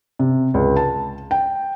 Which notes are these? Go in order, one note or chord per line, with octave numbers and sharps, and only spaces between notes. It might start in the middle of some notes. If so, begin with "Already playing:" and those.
C3
C#2
A5
G5